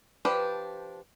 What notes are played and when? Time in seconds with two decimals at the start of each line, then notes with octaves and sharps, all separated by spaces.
0.25 F3 D4 G4 B4 G5